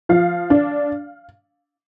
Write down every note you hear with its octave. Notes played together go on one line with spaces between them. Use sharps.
F3 F5
D4